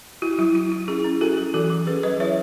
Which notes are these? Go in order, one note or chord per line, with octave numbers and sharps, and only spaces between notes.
E4 F#4
F#3 E4
E4
E4
C#4 E4 G#4
C#4
E4 F#4 A4
F#3
E3 F#4 A4
E3
C#4 G#4 B4
F#3 B4 D#5
E4 C#5 E5